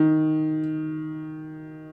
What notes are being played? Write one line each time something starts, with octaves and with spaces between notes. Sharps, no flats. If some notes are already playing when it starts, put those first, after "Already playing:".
Already playing: D#3